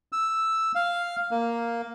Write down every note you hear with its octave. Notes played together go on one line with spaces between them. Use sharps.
E6
F5
A#3